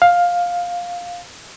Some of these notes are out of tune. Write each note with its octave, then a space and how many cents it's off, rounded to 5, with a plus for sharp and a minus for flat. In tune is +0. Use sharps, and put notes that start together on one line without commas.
F5 +10